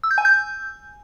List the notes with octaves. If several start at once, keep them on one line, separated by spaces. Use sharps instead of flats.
E6
G6
G#5
G6